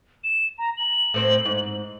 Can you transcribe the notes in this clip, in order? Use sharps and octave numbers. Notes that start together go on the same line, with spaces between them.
E7
A#5
F#7
A2 C4 C5
G#2